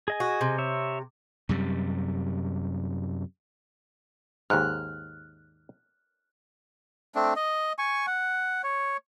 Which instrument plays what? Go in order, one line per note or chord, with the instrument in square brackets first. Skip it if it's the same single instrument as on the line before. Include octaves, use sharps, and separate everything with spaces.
[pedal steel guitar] G#4 D#5 G#5
[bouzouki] F#4
C3
[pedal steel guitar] C#5 E5
[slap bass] F#2 C3 G3
[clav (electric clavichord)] D#2 G#2 [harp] F6 F#6
[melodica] A3 C4 D4
D#5
G#5 C#6
F#5
C#5